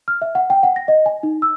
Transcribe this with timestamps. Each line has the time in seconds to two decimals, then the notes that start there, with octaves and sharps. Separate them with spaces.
0.08 F6
0.22 E5
0.35 F#5
0.50 G5
0.63 F#5
0.76 A#6
0.88 D#5
1.06 G#5
1.23 D#4
1.42 E6